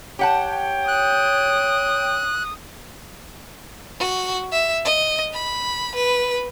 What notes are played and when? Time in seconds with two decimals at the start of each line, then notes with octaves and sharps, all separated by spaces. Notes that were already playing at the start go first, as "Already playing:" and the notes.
0.19 G4 C#5 F#5 G5 A5
0.88 D#6 F#6
4.00 F#4
4.52 E5
4.85 D#5
5.33 B5
5.95 B4